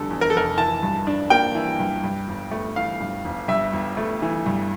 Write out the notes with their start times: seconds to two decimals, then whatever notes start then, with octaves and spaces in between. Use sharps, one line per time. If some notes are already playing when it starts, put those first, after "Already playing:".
Already playing: F1 E2 D3 G3 A4
0.10 E2
0.21 A#4
0.30 A4
0.35 F1 A#4
0.58 E3 A5
0.83 G2
1.07 D4
1.30 A#3 G5
1.55 E3
1.79 G2
2.04 G2
2.28 G1
2.51 A3
2.76 E3 F5
3.01 G2
3.25 G1
3.48 G2 E5
3.73 G1
3.97 A3
4.22 E3
4.46 G2